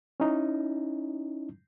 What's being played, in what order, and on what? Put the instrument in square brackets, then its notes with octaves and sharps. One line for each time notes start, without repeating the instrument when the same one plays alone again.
[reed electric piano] C#4 D#4 E4